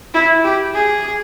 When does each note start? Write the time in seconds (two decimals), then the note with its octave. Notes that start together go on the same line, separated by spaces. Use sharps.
0.14 E4
0.44 G4
0.74 G#4